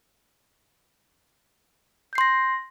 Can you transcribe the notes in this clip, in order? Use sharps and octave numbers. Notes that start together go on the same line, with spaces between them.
C6 G6 A#6 C7